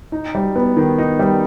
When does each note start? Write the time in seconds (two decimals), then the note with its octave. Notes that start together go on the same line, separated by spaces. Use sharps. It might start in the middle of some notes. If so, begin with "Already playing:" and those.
0.12 D#4
0.35 G3
0.56 B3
0.77 D#3
0.98 D#4
1.19 G3